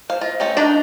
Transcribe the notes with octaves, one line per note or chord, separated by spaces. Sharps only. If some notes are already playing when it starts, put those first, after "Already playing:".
C5 F5
F4 D#5
A3 C4 C#4
D4 D#4 F#4 D5